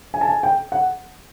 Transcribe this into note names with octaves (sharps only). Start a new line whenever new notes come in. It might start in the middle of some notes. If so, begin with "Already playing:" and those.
G#5
A5
G#5
G5
F#5